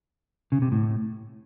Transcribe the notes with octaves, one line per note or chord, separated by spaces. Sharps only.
C#3
C3
A2